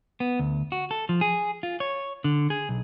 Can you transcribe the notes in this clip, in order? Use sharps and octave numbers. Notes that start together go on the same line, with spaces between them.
B3
D2
F#4
A4
F3
G#4
F4
C#5
D3
G#4
B1